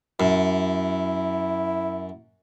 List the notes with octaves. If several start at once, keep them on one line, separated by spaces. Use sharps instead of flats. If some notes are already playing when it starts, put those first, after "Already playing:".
F#2 E4